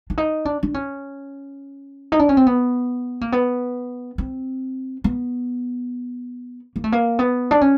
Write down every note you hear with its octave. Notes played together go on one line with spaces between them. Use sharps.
D4
D#4
D4
D4
C#4
D#4
D4
C#4
C4
B3
A#3
B3
C4
B3
A#3
A3
A#3
B3
D4
C#4